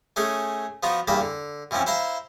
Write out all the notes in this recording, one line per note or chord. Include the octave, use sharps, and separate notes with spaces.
A3 C#4 D#4 G#4
F3 B3 D#4 F4 F#4
E2 G2 A#3 D#4 A5 B5
D3
B2 E3 F3 C4 C#4
E4 C5 F5 A#5 C6